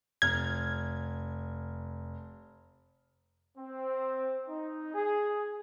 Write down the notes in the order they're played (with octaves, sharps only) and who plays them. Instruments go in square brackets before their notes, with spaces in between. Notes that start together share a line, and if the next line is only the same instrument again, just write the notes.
[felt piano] F1 F6 [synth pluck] G#6
[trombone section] C4
D#4
G#4